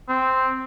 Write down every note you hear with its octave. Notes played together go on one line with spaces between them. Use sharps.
C4